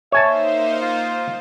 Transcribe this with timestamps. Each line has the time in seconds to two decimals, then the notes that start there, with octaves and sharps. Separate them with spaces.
0.12 A#3 D#4 C5 C#5 E5 G#5 A5
0.81 F4